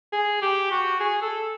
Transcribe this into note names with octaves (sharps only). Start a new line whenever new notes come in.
G#4
G4
F#4
G#4
A4